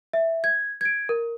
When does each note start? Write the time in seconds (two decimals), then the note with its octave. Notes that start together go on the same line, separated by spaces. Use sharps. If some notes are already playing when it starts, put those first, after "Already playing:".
0.13 E5
0.44 G#6
0.81 G#6 D7
1.09 A#4